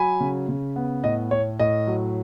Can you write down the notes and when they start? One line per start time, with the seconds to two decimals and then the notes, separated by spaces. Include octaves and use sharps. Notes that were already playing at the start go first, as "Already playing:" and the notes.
Already playing: F#3 G#5 B5
0.20 C#3
0.49 C#3
0.76 B3
1.04 A2 D#5
1.31 A2 C#5
1.59 A2 D#5
1.87 F#3